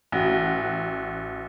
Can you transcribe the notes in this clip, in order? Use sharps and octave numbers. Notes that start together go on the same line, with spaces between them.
A1 F#4